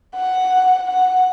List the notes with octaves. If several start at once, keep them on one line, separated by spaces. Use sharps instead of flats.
F#5
F#5